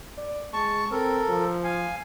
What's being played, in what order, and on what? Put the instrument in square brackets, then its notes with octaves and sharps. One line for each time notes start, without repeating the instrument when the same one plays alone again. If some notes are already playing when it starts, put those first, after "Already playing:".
[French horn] D5
[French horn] G#3 [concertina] A5 C#6
[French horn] C4 [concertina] A4 A#4
[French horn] F3
[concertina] F5 G#5